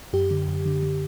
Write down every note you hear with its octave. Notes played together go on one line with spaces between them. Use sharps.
F#2 G4
D3
F#2
D3
D3